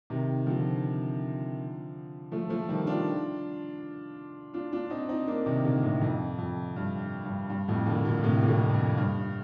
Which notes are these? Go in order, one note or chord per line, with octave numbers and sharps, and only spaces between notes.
C3 D#3
D3 F3
F3 A3
F3 A3
D#3 G3
D4 F4
D4 F4
D4 F4
C4 D#4
C4 D#4
A#3 D4
C3 D#3
A#2 D3
A2 C3
F2
F2
G2
G2
G2
F2 A2
A#2 D3
A#2 D3
A2 C3
A#2
F2 A2
F2
G2